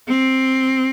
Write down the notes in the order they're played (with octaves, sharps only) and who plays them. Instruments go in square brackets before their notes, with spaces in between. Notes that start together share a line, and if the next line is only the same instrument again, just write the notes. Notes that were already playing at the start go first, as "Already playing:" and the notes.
[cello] C4